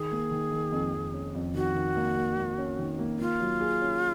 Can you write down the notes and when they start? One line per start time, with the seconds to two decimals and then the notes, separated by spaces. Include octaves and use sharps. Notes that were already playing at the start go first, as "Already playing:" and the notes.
Already playing: D#3 G#4
0.11 A#3
0.31 D#3
0.52 D#3
0.72 F2
0.94 F2
1.13 C#4
1.35 F2
1.54 D#3 F#4
1.75 D#3
1.96 A#3
2.17 A#3
2.38 A#3
2.58 C#4
2.79 D#3
2.99 A#3
3.19 A#3 F4
3.40 F#3
3.61 G#4
3.81 C#4